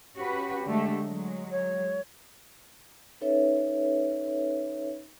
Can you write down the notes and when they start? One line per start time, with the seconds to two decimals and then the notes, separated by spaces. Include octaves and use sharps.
0.16 C#4 F#4 G4 B4
0.65 D3 G#3 A3
1.04 F#3 G#3
1.51 C#5
3.21 C#4 D#4 A4 B4 C#5 E5